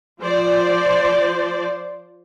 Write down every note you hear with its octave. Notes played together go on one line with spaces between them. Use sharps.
F3 C5 D5